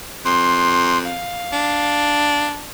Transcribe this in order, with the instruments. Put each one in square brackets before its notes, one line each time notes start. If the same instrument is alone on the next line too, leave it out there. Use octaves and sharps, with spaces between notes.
[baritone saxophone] F2 [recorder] C6
[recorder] F5
[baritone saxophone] D4